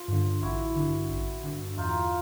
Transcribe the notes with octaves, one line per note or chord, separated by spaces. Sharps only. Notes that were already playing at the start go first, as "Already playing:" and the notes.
Already playing: F4
G2 D3
A1 E4 F#4
G2 D3
A1
G2 D3
E2 D#4 F4